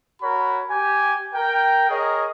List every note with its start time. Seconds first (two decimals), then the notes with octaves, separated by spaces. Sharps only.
0.22 F#4 A#4 C#5 B5
0.70 G4 G#5
1.34 A#4 G5
1.90 G#4 A#4 C#5 D#5